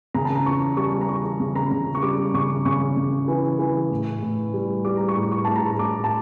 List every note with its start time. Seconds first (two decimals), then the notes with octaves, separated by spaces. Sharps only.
0.14 C#3 A#5
0.25 A5
0.35 A#5
0.46 E2 C#6
0.77 G3 C#6
1.01 A#5
1.09 E2 C#6
1.40 C#3
1.56 A#5
1.71 C#3
1.95 C#6
2.03 G3 D6
2.34 C#3 C#6
2.65 C#3 C#6
2.97 C#3
3.28 E3
3.59 E3
3.90 A2
4.22 A2
4.54 G3
4.85 G3 D6
4.97 A#5
5.08 C#6
5.16 A2
5.32 C#6
5.45 A2 A5
5.56 A#5
5.79 A2 D6
6.04 A5